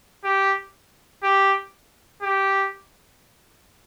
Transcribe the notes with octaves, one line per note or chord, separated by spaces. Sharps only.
G4
G4
G4